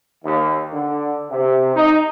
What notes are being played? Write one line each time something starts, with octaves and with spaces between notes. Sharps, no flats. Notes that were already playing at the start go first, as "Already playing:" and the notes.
D#2
D3
C3
D#4